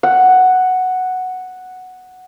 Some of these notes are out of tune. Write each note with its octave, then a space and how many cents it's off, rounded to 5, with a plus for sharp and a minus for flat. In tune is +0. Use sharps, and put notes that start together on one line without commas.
F#5 +0